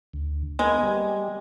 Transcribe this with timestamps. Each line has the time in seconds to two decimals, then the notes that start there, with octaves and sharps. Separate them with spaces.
0.13 D2
0.59 G#3 A#3 B3 G#5
0.83 G3